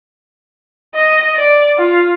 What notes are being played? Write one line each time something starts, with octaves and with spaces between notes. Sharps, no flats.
D#5
D5
F4